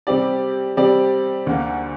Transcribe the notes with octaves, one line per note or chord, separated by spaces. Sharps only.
C3 G3 C4 G4 D5
C3 G3 C4 G4 D5
D2 D3 A#3